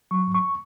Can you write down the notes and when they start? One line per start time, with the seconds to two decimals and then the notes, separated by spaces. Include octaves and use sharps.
0.11 F#3 C#6
0.27 G#2
0.34 C#6